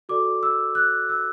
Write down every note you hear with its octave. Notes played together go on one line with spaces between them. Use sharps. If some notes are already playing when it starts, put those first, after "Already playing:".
F#4 A4 D5 D6
E6
F#6
E6